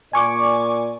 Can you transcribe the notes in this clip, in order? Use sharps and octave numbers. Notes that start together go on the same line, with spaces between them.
A#2 D5 G#5 C#6 D6